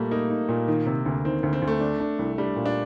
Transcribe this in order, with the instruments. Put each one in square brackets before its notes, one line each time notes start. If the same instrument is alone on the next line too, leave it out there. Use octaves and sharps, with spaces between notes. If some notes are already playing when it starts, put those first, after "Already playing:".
Already playing: [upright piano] A#2 [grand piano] G3 A3 A#3
[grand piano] A#3 [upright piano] D#4
[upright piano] D#4
A#2
D#3
C3
D2
[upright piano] D#3 [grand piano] C4
[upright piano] D2
[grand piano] C4
[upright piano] D2
[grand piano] A3
[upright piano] D4
D4
C2
[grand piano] G3 [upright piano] D4
[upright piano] A#2
[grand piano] D4